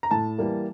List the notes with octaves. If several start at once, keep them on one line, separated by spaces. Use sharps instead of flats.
A#5
A2 A5
E3 G3 A#3